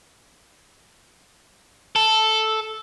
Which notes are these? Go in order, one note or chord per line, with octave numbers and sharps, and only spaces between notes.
A4